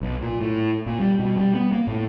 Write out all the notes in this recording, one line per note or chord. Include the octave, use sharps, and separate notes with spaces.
B1
A#2
A2
A#2
G3
B2
G3
B3
A#3
A2